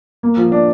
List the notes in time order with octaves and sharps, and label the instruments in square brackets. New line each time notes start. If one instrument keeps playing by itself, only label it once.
[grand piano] A#3
F3
D4